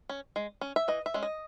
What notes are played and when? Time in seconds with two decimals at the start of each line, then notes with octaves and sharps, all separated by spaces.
0.09 C#4
0.36 G#3
0.61 C#4
0.76 E5
0.88 E3 D#5
1.06 E5
1.14 G#3 C#4
1.23 D#5